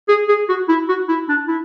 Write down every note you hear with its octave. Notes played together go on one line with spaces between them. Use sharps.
G#4
G#4
F#4
E4
F#4
E4
D4
E4